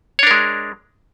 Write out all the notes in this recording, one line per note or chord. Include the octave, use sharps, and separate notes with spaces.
G#3 D4 A#4 C#5